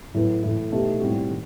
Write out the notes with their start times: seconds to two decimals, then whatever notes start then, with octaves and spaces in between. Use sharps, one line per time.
0.14 A2 F#3 B3
0.43 A2 E3 A3 E4
0.72 B2 A3 D#4 G4
1.01 A2 G3 C4 F#4
1.30 D#3